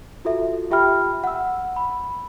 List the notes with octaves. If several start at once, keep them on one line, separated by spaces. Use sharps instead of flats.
F4 F#4 A4 E5
F4 G4 E5 G5 B5 F6
F#5 E6
B5